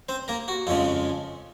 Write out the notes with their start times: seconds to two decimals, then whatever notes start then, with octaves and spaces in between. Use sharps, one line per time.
0.09 C4 C5
0.28 A#3 A#4
0.48 F#4
0.67 F2 C#3 F3 G#3 F4